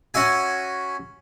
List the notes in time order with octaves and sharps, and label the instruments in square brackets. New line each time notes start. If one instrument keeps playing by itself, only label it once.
[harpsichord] C#4 F#4 E5 G#5